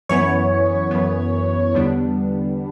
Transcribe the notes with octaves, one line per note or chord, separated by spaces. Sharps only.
F#2 E3 B3 C#5
F#2 E3 B3
E2 D3 G3 B3 D4